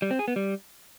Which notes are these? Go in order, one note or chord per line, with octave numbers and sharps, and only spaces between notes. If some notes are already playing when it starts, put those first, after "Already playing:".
G3
C4
G#4
B3
G3